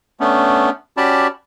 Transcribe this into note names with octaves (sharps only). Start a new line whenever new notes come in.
A3 B3 C#4 D4
C#4 F#4 G4 D5 A5 B5